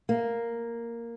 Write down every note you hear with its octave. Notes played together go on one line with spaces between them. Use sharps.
A#3